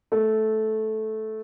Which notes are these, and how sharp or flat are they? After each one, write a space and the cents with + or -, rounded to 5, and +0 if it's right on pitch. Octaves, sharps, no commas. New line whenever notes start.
A3 -10